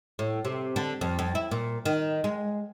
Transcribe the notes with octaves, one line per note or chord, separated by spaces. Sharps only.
A2
C3
D3
F2
F2
E4
A#2
D#3
G#3